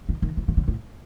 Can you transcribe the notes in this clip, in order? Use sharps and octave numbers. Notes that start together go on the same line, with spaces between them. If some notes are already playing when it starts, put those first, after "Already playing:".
D#3
D#3
E3
D#3
D3
A2